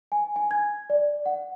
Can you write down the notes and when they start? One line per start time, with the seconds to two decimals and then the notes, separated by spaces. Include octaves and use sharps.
0.12 G#5
0.36 G#5
0.51 G#6
0.90 D5
1.26 F#5